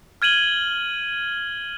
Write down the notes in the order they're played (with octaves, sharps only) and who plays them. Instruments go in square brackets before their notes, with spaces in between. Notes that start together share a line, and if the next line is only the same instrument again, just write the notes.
[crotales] F6 G#6 D#7 F#7 G7